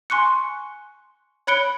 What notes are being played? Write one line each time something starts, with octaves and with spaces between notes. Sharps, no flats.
G#5 C6 C#6 F#6 C#7
C#5 B5 F#6 C#7 D7 G7